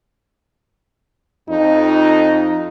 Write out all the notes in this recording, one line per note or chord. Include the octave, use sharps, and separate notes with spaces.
F2 D#4